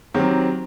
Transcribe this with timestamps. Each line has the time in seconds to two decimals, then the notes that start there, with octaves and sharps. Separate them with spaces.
0.14 D#3 F#3 C4 G4